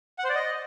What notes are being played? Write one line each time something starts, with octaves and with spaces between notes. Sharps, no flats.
F#5
C5
D5
D#5